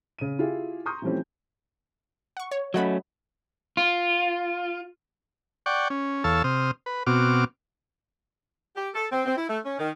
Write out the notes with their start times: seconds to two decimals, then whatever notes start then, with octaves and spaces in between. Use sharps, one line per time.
0.19 C#3 D#7
0.39 E4 F4 G4 G#4
0.86 A#5 C6 C#6 D#6 G6
1.02 E3 F3 G3 A3 C4 C#4
2.37 F#5 C#6
2.51 C#5
2.74 F#3 A3 C#4 D#5 F#5 B5
3.77 F4
5.66 D5 F#5 G5 C#6
5.90 C#4
6.24 E2 A4 C#5 F5 A5 E6
6.44 C3 C5 D#6 F6
6.86 B4
7.07 B2 C4 F#4 D6 F6
8.76 G4
8.95 A4
9.11 C4
9.26 C4
9.37 E4
9.49 A3
9.64 C#4
9.79 D#3